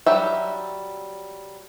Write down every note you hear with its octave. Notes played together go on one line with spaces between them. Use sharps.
F#3 G3 E5